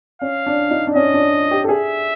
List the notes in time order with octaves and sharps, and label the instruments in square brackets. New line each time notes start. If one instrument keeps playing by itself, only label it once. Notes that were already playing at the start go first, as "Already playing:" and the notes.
[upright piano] C#4 [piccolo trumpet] F5
[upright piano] D4
D#4
D4
[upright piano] C#4 [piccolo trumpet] D#5
[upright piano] D4
G4
A4
[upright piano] G#4 [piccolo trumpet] E5